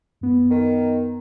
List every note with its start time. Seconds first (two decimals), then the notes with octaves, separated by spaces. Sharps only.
0.21 F#2 B3
0.50 D#3